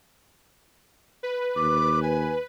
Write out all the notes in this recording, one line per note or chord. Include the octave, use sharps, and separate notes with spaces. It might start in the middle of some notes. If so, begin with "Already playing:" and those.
B4
D#2 D6
G#5